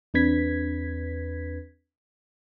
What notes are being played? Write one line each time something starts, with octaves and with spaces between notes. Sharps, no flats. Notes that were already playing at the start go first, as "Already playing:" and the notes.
E2 C4 D4 B4 G#6 B6